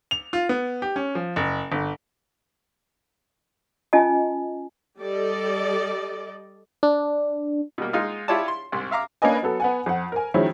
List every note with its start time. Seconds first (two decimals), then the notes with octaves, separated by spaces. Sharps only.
0.11 F7
0.33 F4
0.49 B3
0.82 G4
0.96 C#4
1.15 F3
1.36 F#1
1.72 G1
3.93 C#4 F4 D#5 G#5 A5
4.99 G3 A4 D5 D#5
6.83 D4
7.78 B2 G3 A#3
7.93 G#3 D#4 F4 D#5 F5
8.28 E4 F4 G4 C#5 D5 A5
8.48 C6
8.72 C2 G#2
8.91 E5 F5 A#5 D6
9.22 A#3 C#4 D4 B4 D#5 G#5
9.42 F#3 B3 A4
9.60 B3 F#5 G#5
9.86 F2 F#5
10.12 A#4 G#5
10.34 D#3 F3 F#3 G#3 C#4 E4